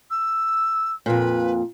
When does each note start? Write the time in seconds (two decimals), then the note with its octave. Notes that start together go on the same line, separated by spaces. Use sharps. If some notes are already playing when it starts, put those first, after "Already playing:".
0.10 E6
1.06 F2 A#2 B4